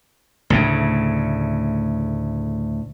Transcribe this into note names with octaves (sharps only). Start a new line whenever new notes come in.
D2 A2 C#3